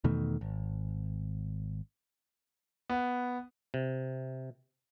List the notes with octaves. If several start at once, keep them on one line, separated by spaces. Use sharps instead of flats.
E2 B2 D#3 A3
G#1
B3
C3